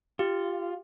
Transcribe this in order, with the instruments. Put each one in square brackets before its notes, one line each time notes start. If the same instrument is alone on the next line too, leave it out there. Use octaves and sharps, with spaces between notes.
[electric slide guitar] F4 [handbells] G4